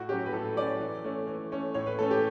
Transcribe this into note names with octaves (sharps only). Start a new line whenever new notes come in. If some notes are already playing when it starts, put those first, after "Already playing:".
Already playing: A2 F#4
F#3 C#4 G4
B4
A2 A4
F#3 C#4 D5
E3
A3 C#4
E3
A3 C#4
A2 C#5
B4
E3 A3 C#4 A4
G4